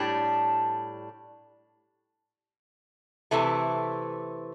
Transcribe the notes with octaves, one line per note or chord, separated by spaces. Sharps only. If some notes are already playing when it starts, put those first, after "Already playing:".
Already playing: A2 G3 D4
C3 E3 A3